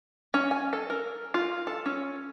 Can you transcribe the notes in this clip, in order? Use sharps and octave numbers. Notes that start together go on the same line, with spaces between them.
C#4
G#5
A4
A#4
F4
A4
C#4